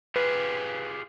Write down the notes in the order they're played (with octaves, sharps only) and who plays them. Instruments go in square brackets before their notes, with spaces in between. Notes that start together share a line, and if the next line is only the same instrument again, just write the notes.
[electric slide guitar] F4 G4 G#4 [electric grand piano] B4